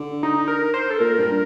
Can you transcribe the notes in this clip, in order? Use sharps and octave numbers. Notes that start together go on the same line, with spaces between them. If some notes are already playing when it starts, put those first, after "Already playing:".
Already playing: D3
D#4
A#4
C5
A4
A#2 A#4
G2